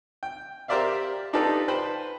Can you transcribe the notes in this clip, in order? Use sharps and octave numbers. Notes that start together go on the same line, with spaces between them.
G5
G4 A#4 C5 D5 E5 F5
D4 D#4 F4 G4 A4 B4
B4 C5 G5 A5 B5